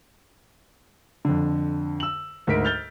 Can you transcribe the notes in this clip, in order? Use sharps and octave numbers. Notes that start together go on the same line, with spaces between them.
F2 D3
E6 F#7
D2 G#2 A#4 B6 D7
F6 G6 A6 F7 G7